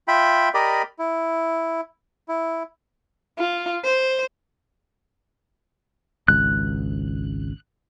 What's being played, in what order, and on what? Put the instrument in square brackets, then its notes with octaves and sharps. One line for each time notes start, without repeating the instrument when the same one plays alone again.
[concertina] F4 E5 G5 B5
G4 A#4 D5 D#5 B5
E4
E4
[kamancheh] F4
C5
[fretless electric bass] G#1 C#2 [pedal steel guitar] F#6